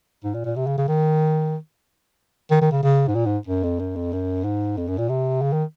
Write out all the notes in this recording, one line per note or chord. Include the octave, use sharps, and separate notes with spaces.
G#2
A#2
A#2
C3
C#3
C#3
D#3
D#3
D#3
C#3
C#3
G#2
A#2
G#2
F#2
F2
F#2
F2
F#2
G#2
F2
F#2
A#2
C3
C#3
D#3